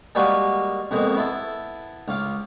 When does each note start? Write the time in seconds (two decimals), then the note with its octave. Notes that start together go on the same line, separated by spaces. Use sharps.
0.15 G3 G#3 A#3 F#4 B4
0.91 F2 B2 G#3 A#3
1.15 B3 E4 A4
2.08 C#2 F5 D6